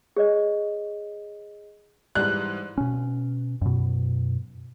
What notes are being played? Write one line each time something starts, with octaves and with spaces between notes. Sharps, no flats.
G#4 C#5 D#5
G#2 E3 G3 D5 F#6
B2 C#4
F#2 B2